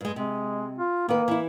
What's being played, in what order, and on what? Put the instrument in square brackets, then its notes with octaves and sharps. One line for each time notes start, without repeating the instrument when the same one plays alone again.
[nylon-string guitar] G2 G#3
[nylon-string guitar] C3 [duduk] G#3
[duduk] F4
[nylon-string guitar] D#3 B4 [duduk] A#3
[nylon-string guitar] E3 E4